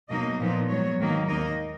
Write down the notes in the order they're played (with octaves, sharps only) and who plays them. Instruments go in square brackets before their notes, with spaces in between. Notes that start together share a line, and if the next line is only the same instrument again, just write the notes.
[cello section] B2 F#3 A#3 D#4 D#5
A#2 F3 B3 D#4
G#2 F#3 B3 C#5
G#2 D#3 F#3 A#3 D#4
D#2 D#3 A#3 D#4 D#5